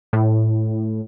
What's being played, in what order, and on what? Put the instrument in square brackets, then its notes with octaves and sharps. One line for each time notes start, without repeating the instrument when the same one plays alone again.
[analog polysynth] A2